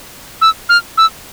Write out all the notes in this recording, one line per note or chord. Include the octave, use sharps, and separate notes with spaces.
E6
F6
E6